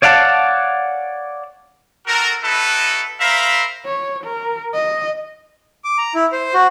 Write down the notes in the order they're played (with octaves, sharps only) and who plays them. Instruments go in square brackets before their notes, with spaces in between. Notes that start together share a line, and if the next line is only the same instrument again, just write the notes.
[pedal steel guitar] C#5 D5 F5 F#5 A5
[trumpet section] C4 F#4 A4 A#4
D#4 E4 F#4 A4 B4
A#4 C5 E5 F5 A#5 B5
[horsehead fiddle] C#5
A#4
D#5
[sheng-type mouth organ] D6
A#5
E4
C5
F#4